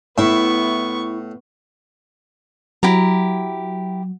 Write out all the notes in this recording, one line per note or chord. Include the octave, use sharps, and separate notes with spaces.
A2 B3 E4 E5 C#6
F#3 E4 G4 A#5